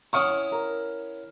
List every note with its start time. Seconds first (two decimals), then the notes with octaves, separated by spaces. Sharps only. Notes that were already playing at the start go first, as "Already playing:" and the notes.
0.13 C#4 E4 F#5 C#6 D#6 F6
0.51 A#4 A#5